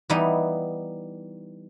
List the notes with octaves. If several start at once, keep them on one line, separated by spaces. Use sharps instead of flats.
E3 G3 B3 D#4